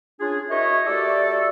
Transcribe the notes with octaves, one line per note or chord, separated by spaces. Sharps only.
C#4 D4 F4 G#4
E4 F#4 A#4 C#5 D#5 E5
A3 F#4 G4 A4 D5